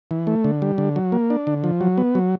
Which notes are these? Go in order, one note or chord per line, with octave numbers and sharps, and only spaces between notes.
E3
A3
D3
G3
D3
F#3
A#3
D4
D3
F3
F#3
B3
F#3